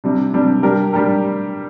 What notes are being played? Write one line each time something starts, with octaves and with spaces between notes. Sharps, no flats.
C3 G3 D4
C3 G3 D4
G3 D4 G4 A#4
G3 D4 G4 A#4